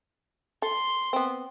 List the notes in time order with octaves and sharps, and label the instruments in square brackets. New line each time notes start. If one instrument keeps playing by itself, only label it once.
[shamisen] A4 [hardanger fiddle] C6
[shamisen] B3 C4